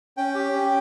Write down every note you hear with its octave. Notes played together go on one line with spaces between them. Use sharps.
C#4 G5
G4
C#4